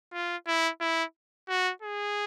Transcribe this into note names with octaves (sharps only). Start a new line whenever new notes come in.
F4
E4
E4
F#4
G#4